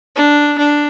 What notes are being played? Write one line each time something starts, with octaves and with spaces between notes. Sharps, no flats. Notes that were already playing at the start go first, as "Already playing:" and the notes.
D4
D4